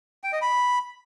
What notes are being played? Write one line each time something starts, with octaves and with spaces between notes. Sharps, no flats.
G5
D#5
B5